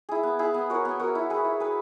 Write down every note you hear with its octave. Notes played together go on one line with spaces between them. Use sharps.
E4 G#4
B3
E4 G#4
B3
F#4 A#4 C#5
B3
F#4 A#4 C#5
E4
G#4 B4
E4
G#4 B4